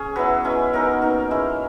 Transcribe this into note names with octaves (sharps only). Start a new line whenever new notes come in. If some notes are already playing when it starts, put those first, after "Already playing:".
Already playing: C#4 G#4
F#3 B3 E4 B4
G#3 C#4 E4
F#3 B3 D#4 A#4
A#3 D#4
G#3 C#4 E4